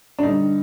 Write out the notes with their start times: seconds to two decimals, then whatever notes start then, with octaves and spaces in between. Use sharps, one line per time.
0.19 D4
0.23 G2 D3 D#4